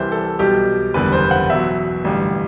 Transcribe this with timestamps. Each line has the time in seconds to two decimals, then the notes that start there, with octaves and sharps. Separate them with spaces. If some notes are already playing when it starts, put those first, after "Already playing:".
Already playing: C2 C3 E3 G3 C5
0.12 A4
0.39 B1 B2 G3 G4
0.94 F#1 E2 D3 G3 B4
1.12 C5
1.31 F#5
1.49 E2 B2 F#3 E5
2.04 A1 G2 D3 G3